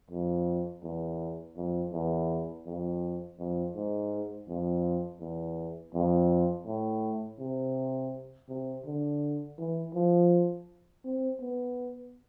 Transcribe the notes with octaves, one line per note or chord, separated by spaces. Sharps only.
F2
E2
F2
E2
F2
F2
G#2
F2
E2
F2
A2
C3
C3
D3
E3
F3
C4
B3